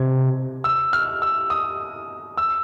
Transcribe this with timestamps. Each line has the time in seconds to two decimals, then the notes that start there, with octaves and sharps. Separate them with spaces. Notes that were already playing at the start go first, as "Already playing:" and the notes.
Already playing: C3 G#6
0.64 E6
0.93 F6
1.22 E6
1.50 D#6
2.37 E6